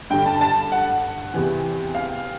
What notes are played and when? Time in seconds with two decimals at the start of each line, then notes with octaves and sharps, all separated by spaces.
0.10 G2 D3 G5
0.26 A5
0.41 A5
0.72 F#5
1.34 E2 C3 E3
1.95 F5